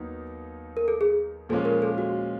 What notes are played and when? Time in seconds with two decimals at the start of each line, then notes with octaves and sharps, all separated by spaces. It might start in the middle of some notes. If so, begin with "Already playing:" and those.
Already playing: D#2 D#3 F#3 B3 D#4
0.77 A#4
0.88 A4
1.01 G#4
1.49 A#2 F3 G#3 C#4 F4 A4
1.65 A#4
1.82 A4
1.98 F#4